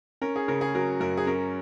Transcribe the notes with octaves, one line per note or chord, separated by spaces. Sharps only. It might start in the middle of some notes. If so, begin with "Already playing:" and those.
C#4 A#4
G#4
C#3 A#4
G#4
F#3 A#4
F#2 A#4
G#4
C#4 A#4